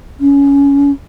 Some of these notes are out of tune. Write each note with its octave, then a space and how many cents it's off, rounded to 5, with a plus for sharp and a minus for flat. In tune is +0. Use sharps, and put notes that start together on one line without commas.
C#4 +20